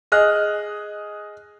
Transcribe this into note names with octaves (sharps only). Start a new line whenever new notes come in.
G#4 D#5 F6 F#6